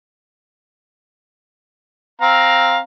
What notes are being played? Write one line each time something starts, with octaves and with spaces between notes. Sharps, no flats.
C4 F5 A#5